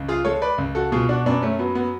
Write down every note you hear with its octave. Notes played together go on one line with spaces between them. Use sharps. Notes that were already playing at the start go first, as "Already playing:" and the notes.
Already playing: C#2
F4 G#4
G#3 A4 C#5
B4 D5
C#2
F#4 A4
B2 F4 G#4
D4 F#4
F#2 B3 D4
A3 C#4
F#3 B3
B3